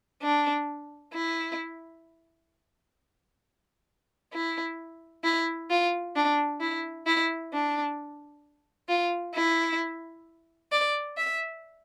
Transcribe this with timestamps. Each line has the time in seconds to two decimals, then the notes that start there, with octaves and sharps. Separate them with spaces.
0.22 D4
1.14 E4
4.33 E4
5.24 E4
5.70 F4
6.16 D4
6.60 E4
7.06 E4
7.53 D4
8.89 F4
9.34 E4
10.72 D5
11.17 E5